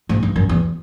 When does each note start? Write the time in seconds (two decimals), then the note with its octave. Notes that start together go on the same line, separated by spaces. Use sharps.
0.09 G#2
0.23 G2
0.36 F#2
0.49 E2